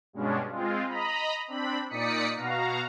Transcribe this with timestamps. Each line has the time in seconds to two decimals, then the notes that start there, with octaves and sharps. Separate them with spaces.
0.13 G2 B2 G#3 C#4 D4
0.50 G#3 C4 F4
0.87 D#5 A#5 B5
1.48 C4 D4 B5
1.90 A#2 D#4 D5 D#6 B6 C#7
2.36 B2 F#4 F5 A#5